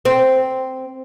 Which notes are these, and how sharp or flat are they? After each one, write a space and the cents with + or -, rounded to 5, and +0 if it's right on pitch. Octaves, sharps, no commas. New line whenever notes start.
C4 -5